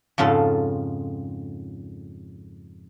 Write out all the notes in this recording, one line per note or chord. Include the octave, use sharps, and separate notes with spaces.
F2 G#2 C#3 F4 A4